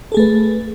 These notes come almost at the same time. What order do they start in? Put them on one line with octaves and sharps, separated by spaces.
A4 G#4 A3 B4